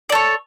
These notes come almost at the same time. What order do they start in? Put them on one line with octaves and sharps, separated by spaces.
D5 A4 C#5